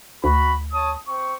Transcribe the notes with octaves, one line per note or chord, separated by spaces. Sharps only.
D2 F#4 B5
C#5 A5 D#6
C4 C#6